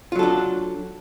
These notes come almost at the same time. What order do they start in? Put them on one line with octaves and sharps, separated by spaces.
F4 F#3 A4 D4